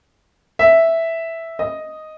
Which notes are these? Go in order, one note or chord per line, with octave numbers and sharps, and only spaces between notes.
E5
D#5